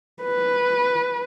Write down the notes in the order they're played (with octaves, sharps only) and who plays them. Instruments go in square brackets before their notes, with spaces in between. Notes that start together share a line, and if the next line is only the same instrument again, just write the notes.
[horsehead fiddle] B4